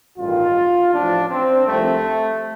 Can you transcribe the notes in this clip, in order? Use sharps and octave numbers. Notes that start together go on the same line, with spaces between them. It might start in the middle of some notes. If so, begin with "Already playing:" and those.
A1 G2 D#3 F4
A1 A2 F3 D4
C4
C2 C3 F3 A3